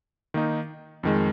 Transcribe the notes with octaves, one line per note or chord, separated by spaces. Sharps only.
D#3 A#3 D#4
F2 D#3 G#3